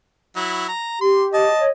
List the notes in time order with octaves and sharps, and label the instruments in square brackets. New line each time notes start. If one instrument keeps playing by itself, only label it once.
[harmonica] F#3 E4
A#5
[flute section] G4 [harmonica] C6
[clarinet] D#5 [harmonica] A5
[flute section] C#5